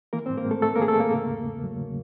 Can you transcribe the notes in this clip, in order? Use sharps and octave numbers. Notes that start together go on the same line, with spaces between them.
E3 A#3 A#4
C4 C5
G#2
A#3 A#4
G#2
A3 A4
A3 A4
A#3 A#4
E3 G#4
A3 A4
G#2 A#3 A#4
C#3
E2
A3
F#3
C#3